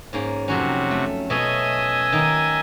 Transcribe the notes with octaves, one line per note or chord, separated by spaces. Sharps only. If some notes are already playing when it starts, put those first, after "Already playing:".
G#2 A#3 C#4
F2 C3 F#3 C#4 F#4
A3
B2 A3 C#4 D#5 E5 G#5
D#3 A#3 D#4